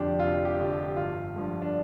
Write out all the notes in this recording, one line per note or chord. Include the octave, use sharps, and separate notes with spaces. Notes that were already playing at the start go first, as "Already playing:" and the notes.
Already playing: F1 F2 D3 F3 D4 G4
F1 F4
G4
F2 D3 F3
G4
G1 F4
G2 D3 F3
D4